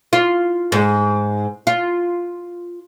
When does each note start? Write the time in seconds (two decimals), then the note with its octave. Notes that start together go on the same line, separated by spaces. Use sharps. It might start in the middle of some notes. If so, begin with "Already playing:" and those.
0.13 F4
0.72 G#2
1.67 F4